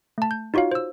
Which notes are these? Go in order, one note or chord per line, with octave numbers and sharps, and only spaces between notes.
A3 A5
G6
D#4 F4 F#4 C#5 F5
C5 E6